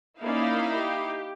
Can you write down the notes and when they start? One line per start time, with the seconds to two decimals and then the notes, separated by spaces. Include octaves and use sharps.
0.22 A#3 C#4 D#4 E4 D5 F5
0.77 G4